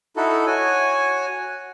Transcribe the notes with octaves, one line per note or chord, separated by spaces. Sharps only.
D#4 E4 F#4 A4
F#4 C#5 G#5